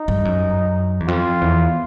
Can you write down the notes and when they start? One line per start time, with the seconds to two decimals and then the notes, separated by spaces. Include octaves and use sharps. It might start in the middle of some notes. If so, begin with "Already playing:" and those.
Already playing: D#4
0.08 G2
0.25 F#2
1.00 E2
1.07 F2 F4
1.41 E2